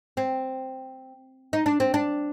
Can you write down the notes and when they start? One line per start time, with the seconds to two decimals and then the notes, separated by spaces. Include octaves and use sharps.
0.17 C4
1.53 D#4
1.66 D4
1.80 C4
1.94 D4